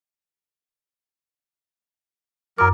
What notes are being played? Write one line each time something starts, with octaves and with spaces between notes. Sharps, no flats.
F#2 F#3 A#4 D6